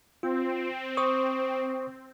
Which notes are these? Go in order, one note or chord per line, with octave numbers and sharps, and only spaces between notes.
C4 F4
C5 C#6 D#6